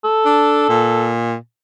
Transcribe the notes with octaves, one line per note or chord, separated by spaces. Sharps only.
A4
D4
A#2